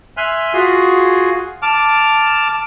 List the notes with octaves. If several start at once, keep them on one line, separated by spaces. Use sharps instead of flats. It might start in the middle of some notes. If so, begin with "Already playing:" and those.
E5 G#5 C6 F6 F#6
F4 F#4 G#4
A5 D6 F6